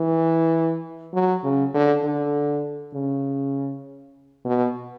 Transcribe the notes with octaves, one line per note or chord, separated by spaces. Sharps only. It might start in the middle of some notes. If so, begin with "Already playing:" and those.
Already playing: E3
F#3
C#3
D3
D3
C#3
B2